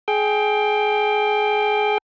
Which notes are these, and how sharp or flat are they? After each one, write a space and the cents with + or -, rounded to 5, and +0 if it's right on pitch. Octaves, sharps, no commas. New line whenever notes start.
G#4 +25 G5 +10